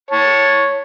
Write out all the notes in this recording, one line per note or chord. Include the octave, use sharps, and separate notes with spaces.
C#5 A5